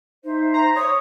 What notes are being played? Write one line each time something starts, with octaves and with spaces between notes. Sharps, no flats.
D#4 C5 E5
A#5
C#5 D#6